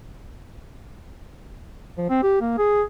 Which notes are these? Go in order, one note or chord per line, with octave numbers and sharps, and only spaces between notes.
F3
C4
G4
A#3
G#4